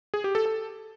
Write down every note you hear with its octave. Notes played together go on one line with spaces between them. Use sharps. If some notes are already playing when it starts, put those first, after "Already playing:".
G#4
G4
A4
A4